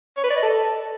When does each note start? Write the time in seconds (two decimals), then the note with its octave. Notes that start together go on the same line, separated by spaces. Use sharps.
0.17 C#5
0.24 B4
0.30 D5
0.36 D#5
0.43 A4